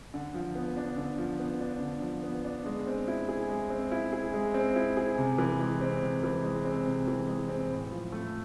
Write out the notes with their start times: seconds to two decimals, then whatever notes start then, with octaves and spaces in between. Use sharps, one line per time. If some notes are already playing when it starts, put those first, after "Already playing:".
0.14 D3
0.34 F3
0.55 B3
0.77 D4
0.97 D3
1.18 F3
1.40 B3
1.60 D4
1.81 D3
2.02 F3
2.24 B3
2.44 D4
2.66 G#3
2.87 C4
3.08 E4
3.28 G#4
3.49 G#3
3.70 C4
3.92 E4
4.13 G#4
4.33 G#3
4.54 C4
4.76 E4
4.97 G#4
5.18 C3
5.38 E3
5.60 G#3
5.81 C4
6.02 C3
6.24 E3
6.44 G#3
6.65 C4
6.87 C3
7.07 E3
7.28 G#3
7.49 C4
7.70 A2
7.92 F3
8.12 A3